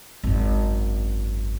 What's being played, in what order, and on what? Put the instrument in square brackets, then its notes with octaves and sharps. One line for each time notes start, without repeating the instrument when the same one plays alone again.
[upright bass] G#1 F#2